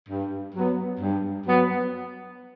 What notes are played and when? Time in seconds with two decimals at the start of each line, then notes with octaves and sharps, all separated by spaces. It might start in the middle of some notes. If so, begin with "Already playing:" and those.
0.09 G2
0.55 F#3 B3
1.00 G2
1.46 F#3 B3